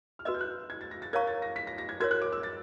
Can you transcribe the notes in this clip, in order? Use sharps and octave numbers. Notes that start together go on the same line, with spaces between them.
F6
F#4 B4 D#5 E6
G6
F#6
G#6
A6
A#6
A6
A#4 C#5 F5 A#5 C#6 G#6
A6
A#6
B6
A#6
A#6
G#6
F#4 A#4 C#5 G#6
F#6
D6
E6
A6